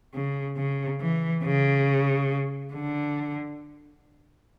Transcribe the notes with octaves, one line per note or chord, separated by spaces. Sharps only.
C#3
C#3
E3
C#3
D3